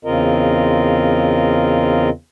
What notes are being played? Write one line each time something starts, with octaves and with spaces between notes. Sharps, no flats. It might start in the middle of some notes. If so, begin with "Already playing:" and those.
E2 C#3 C4 F4 A#4 D#5